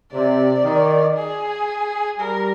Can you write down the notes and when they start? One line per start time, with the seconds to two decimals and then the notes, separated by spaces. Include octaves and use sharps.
0.12 C3 D5
0.64 D#3
1.16 G#4
2.19 G3 A#4